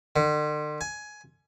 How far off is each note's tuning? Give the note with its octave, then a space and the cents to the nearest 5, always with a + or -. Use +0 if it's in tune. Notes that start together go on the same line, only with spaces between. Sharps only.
D3 +45
G#5 +15